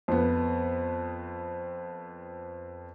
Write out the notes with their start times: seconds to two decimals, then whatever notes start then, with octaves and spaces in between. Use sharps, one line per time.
0.08 F2 B3